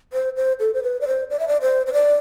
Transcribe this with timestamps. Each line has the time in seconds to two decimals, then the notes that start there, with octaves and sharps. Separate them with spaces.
0.13 C5
0.37 C5
0.60 A4
0.74 C5
0.83 B4
1.01 D5
1.07 C5
1.30 D5
1.39 E5
1.48 D5
1.62 C5
1.87 C5
1.93 D5